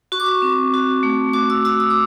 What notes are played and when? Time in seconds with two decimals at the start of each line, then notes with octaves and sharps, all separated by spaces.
0.12 F#4 C#6
0.20 D6
0.26 C#6
0.42 C4
0.74 F#4
1.03 A3
1.33 F#4 D6
1.50 E6
1.65 F#4 E6
1.80 D#6
1.90 D6